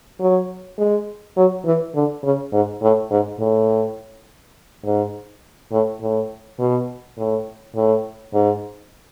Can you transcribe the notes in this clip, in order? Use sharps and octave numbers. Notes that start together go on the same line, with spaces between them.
F#3
G#3
F#3
E3
D3
C#3
G#2
A2
G#2
A2
G#2
A2
A2
B2
A2
A2
G#2